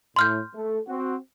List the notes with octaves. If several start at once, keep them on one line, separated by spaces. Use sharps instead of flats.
A2 C6 F6 G6
A3
C4 F#4